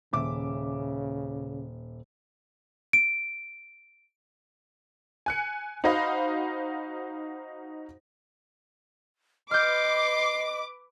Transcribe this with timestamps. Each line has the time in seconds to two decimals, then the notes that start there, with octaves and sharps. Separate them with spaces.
0.13 D#1 C#3 E5 D6
2.93 D7
5.26 G#5 F#6 C#7
5.84 D#4 F#4 C5 D#5 F5 B5
9.51 B4 D#5 C6 D6 F6 G6